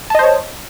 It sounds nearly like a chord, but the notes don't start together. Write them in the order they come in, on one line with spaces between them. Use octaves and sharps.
A5 D#5 C5 C#5